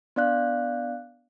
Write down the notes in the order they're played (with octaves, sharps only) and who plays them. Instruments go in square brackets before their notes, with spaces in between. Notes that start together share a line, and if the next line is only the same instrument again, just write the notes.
[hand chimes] B3 D4 D5 F5 F#6